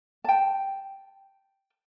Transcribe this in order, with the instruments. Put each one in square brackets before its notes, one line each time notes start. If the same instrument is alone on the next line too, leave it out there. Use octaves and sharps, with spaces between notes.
[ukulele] G5 A5